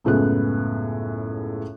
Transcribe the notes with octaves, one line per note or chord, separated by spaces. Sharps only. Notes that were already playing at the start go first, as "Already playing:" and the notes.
C#2 F#2 A2 G#3 B3 F#6